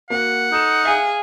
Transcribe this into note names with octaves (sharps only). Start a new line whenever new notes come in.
A#3 F#4 F#5
D#4 A4 E7
G#4 E5 F5 G#5